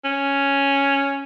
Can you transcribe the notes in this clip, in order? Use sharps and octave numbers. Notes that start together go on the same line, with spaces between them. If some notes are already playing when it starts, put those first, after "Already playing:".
C#4